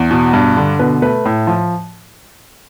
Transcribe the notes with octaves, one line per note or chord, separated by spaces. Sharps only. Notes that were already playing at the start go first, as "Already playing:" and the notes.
Already playing: E2
B2
G2
D3
B2 B4
A3 B4
A2
F3